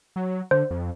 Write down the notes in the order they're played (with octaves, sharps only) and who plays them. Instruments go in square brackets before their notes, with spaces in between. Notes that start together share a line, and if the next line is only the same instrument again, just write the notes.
[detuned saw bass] F#3
[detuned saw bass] D3 [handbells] C5
[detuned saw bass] F2